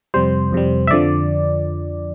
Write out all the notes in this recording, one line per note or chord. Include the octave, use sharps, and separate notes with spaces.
F2 C3 G3 C5
F2 C3 G3
E5
F2 D3 F3 D5